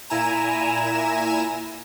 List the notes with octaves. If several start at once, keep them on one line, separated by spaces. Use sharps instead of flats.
A#2 E4 G#5 A#5 E7